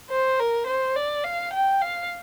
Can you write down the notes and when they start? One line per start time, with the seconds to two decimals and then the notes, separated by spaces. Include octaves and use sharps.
0.10 C5
0.39 A#4
0.67 C5
0.96 D5
1.24 F5
1.53 G5
1.82 F5